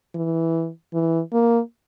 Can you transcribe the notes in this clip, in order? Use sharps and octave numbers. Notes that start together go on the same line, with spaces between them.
E3
E3
A#3